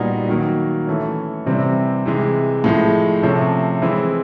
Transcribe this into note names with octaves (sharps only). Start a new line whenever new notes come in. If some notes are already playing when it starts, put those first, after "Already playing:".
Already playing: A#2 G3 B3 D#4 F#4
D#3 F#3 A#3
E3 A3 C#4
C3 E3 G3 C4
C3 E3 G#3
A2 F3 G#3
C3 F3 A3 C#4
E3 G#3 C4 E4